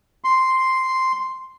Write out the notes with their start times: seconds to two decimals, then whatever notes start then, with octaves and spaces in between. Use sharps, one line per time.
0.24 C6